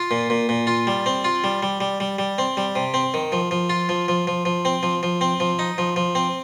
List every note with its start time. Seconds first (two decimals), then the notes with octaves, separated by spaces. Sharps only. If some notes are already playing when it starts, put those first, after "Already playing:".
Already playing: F4
0.11 A#2
0.30 A#2
0.49 A#2
0.67 F4
0.87 G3
1.06 C4
1.24 F4
1.44 G3
1.63 G3
1.81 G3
2.00 G3
2.19 G3
2.38 C4
2.57 G3
2.75 C3
2.94 C4
3.14 D#3
3.32 F3
3.51 F3
3.70 F4
3.89 F3
4.08 F3
4.27 F3
4.45 F3
4.65 C4
4.83 F3
5.03 F3
5.21 C4
5.40 F3
5.59 D#4
5.78 F3
5.96 F3
6.15 C4